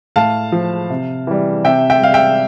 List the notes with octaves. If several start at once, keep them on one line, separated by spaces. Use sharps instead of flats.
A2 F5 A5
F3
C3
E3 G3
C3 E5 G5
E5 G5
G3 F5
E5 G5